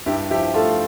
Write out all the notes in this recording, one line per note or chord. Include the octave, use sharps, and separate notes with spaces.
G2 E4 G4
F3 E4 G4
A3 F4 A4